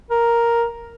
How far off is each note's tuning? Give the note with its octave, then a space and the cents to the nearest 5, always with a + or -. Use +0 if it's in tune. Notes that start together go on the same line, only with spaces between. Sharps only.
A#4 +5